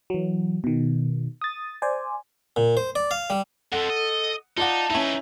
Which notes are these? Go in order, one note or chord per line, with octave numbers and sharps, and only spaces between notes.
E3 F#3
B2 D#3
D#6 A6
C5 D5 G#5
A#2
C5
D5
F5
G3
F2 F3 A4 F#5
D#5
D#4 F4 D5 F#5 A5
C#4 D#4 E4 B4